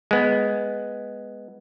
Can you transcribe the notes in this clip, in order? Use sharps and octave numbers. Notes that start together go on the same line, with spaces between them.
G#3 B3